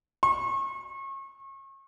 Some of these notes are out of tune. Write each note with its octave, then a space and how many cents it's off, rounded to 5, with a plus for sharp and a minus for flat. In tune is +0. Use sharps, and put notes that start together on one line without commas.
C#6 -35